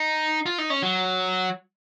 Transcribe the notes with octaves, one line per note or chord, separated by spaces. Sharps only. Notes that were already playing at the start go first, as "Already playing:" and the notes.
Already playing: D#4
F4
D#4
C#4
F#3